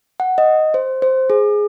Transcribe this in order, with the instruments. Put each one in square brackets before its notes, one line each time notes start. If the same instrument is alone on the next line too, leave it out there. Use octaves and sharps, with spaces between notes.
[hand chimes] F#5
D#5
C5
C5
G#4